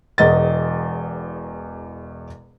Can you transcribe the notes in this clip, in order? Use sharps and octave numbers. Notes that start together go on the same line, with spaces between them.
E1 E2 D#5 A6